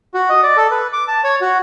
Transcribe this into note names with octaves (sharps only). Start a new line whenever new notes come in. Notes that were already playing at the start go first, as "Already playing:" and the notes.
F#4
D#5
D5
A4
B4
D6
A5
C#5
F#4